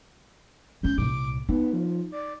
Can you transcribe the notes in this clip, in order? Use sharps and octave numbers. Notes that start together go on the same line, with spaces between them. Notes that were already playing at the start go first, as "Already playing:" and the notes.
G#1 C#4 G6
C2 A#2 D6
B3 D#4
F3
D5